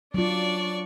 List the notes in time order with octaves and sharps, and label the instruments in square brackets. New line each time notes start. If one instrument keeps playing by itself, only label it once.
[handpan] F#3 F4 [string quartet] D4 D5 C#6